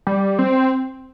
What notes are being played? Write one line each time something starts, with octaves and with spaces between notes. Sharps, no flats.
G3
C4